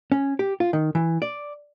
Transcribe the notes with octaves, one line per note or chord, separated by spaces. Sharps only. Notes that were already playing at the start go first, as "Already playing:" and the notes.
C#4
G4
F4
D#3
E3
D5